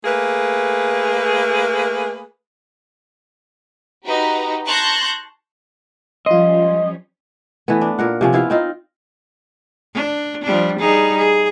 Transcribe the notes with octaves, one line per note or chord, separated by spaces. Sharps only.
A3 A#3 G#4 B4
D#4 F#4 G4 B4
A5 C6 C#6 F#6 G6 A#6
F3 G3 C#4 F4 D#5 C6
E3 A3 B3
D4
A#2 A#4 F#5
C3 F3 C#4
B3 E4 F4 F5
C4 D#4 F4
D4
F3 G3 D4
G3 D#4 G#4
G#4